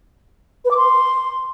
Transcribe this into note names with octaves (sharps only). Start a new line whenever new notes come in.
B4
D6
C6